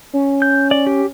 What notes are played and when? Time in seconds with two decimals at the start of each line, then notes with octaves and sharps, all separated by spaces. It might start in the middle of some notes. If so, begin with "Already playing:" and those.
0.13 C#4
0.42 G6
0.71 D5
0.87 G4